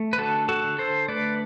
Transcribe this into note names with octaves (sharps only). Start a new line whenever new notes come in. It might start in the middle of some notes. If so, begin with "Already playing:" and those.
Already playing: A3
B4
D3 F#4 A4
F#4 A4
D3
A4 C5
A3 B4 D5